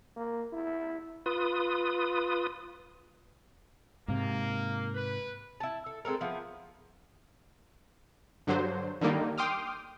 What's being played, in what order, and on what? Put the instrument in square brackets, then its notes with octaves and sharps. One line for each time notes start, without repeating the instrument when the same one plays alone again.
[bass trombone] A#3
E4
[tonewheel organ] F4 B4 D#6
[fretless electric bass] G#2 C3 [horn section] A#3
[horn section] B4
[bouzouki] E4 A5
A4
G#3 C4 A4 A#4
F3 B3 E4
[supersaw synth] G2 D3 F#3 C5
D3 D#3 G3 A#3 D#4
G5 C6 D6 D#6 F6